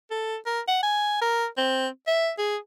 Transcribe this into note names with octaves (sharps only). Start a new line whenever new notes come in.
A4
A#4
F#5
G#5
A#4
C4
E5
G#4